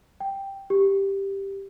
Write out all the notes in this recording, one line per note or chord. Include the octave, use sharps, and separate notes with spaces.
G5
G4